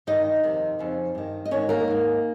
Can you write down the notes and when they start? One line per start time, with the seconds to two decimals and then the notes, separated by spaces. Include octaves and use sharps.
0.07 G2 D#3 D#4 D#5
0.44 F2 C3 D#3
0.79 F2 C#3
1.15 G2 D#3
1.45 D#5
1.51 G#2 D#3 C#4 C#5
1.69 A#3 A#4
1.88 G#2 D#3